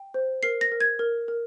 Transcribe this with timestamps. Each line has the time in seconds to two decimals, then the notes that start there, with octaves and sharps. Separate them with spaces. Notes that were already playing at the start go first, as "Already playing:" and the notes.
Already playing: G5
0.14 C5
0.43 A#4 C7
0.61 A#6
0.72 A#4
0.81 G#6
0.99 A#4
1.28 A#4